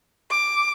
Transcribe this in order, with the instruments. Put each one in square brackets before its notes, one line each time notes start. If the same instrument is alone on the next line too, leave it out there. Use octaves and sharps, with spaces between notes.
[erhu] D6